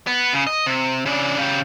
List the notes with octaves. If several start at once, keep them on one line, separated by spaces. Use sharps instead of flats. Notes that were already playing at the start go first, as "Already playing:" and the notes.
B3
C#3
D#5
C3
C#3 D4
C#3 G4